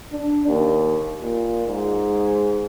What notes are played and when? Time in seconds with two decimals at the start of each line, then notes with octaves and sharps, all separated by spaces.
0.12 D4
0.48 D#2
1.22 A#2
1.67 G#2